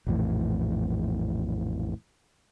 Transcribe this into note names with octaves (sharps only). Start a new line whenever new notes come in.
A#1 F2 A2 E3